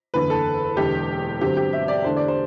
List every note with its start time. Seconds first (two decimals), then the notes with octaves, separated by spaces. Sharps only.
0.14 F#1 E2 D3 B4
0.30 A4
0.77 E1 E2 D3 G4
1.41 G2 D3 F#3 C4 G4
1.57 G4
1.73 E5
1.88 D5
2.04 E2 D3 A3 D4 C5
2.16 D5
2.28 C5